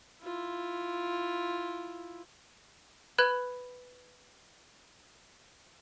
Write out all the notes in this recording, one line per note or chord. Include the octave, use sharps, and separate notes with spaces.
E4 F4
B4 B5 F#6 G#6